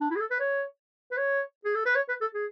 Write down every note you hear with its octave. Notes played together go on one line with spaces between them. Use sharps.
D4
E4
G#4
A4
B4
C#5
B4
C#5
G#4
A4
B4
C#5
B4
A4
G#4